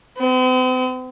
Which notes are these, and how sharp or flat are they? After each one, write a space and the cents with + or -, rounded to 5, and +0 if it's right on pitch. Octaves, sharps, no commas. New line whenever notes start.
C4 -45